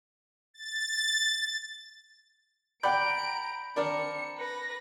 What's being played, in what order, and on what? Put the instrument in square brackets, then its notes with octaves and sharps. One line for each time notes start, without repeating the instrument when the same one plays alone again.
[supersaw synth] A6
[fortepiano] D5 F#5 G5 [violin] A#5 D7 [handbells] B5 G6
[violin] C4 C#7 [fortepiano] D4 A#4 D5
[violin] B4 A#6